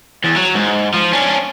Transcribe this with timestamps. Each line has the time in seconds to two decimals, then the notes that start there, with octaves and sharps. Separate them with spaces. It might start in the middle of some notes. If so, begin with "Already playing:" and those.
0.24 E2
0.36 F#3
0.55 G#2
0.94 F3
1.13 C#4 D4